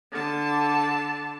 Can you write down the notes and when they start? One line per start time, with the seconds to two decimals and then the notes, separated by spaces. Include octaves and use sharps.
0.12 D3 A5